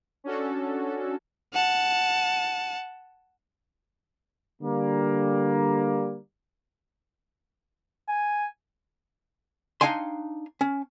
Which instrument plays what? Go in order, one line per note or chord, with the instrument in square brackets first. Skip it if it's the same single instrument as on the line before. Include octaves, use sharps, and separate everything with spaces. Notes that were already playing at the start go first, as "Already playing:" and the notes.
[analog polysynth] C#4 D4 F#4 A4
[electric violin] F#5 A5
[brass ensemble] D3 G3 A#3
[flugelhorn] G#5
[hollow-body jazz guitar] D4 D#4 F5 G5 G#5 C6
C#4